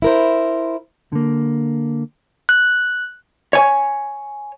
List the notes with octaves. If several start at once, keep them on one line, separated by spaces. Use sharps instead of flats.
E4 A#4 C5
D3 A#3
F#6
C#5 G#5